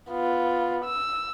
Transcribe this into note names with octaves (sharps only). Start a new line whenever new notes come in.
B3 F4
E6